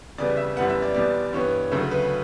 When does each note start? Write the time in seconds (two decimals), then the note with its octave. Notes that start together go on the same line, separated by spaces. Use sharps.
0.18 E2 C#3 G3 B3 D5
0.37 E5
0.56 F#2 E3 G3 B3 F#5
0.70 E5
0.82 D5
0.94 E2 B2 G3 B3 D5
1.33 G2 E3 B3 C#5
1.72 D2 C#3 F#3 A3 A4
1.91 B4